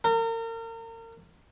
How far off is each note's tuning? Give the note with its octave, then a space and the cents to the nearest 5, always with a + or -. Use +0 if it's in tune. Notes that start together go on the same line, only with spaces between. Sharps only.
A#4 -35